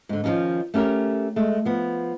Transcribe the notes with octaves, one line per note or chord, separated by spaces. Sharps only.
G#2 D3
D#3 F3 G#3 C#4 D#4
A3 C#4 G4 A#4
G#3 A3
F3 B3